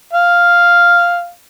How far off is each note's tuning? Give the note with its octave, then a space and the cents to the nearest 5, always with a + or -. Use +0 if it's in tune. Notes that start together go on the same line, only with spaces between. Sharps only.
F5 +0